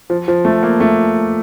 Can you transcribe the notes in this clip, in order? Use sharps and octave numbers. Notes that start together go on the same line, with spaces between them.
F3
F3
A3
A#3
A3